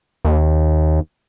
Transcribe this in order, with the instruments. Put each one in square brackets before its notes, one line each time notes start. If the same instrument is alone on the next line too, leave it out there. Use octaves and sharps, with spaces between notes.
[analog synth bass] D#2